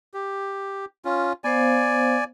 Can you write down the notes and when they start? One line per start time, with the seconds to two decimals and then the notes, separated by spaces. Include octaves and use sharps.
0.14 G4
1.05 C#4 F4
1.44 B3 C5 D5 F5 G#5